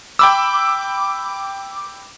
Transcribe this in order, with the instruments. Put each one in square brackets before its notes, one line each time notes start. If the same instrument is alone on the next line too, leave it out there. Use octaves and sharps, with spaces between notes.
[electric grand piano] G5 B5 E6 [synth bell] D6